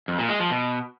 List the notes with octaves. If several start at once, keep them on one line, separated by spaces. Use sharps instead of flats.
F2
A#2
G#3
F3
B2